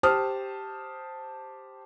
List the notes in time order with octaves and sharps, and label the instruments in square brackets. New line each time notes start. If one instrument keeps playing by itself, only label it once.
[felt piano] G4 C5 A5 D#6 F6